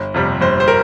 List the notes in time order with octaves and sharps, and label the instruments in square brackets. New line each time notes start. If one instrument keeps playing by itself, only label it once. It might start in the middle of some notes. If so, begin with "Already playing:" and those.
Already playing: [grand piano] G1
F2 C3 G3
G1 C5
C5
A#4